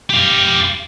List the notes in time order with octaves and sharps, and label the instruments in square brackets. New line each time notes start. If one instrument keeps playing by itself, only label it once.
[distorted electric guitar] G4 F5